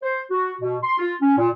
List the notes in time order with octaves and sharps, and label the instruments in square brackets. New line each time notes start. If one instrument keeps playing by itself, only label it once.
[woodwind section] C5
F#4
B2
C6
F4
C#4
A#2